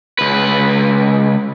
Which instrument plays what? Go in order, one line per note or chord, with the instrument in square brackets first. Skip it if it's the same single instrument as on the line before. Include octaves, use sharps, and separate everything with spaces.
[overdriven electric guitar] C#2 B4